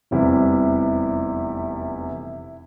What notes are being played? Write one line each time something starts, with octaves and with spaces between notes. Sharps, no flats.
F1 E2 C3 G3 E4